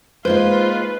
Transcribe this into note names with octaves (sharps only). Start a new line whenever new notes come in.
G#3 A#3 D#4 F4 B4 C5